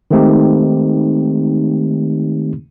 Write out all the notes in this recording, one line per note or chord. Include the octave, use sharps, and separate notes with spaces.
D#3 G#3 A3 C4 D#4 G4